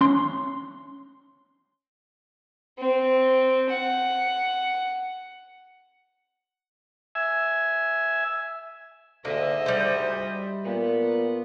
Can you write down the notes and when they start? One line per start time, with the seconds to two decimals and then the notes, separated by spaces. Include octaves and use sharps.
0.01 C#4 C6
2.79 C4
3.70 F#5
7.15 E5 G#5
9.25 D2 G#2 D3 A#3 D#5 E5
9.66 G3 C5
10.64 A#2 B3